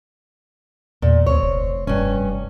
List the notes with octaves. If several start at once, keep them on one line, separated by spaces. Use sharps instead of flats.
E2 A#2
D2 C4 C#5
F1
F1 G2 C#4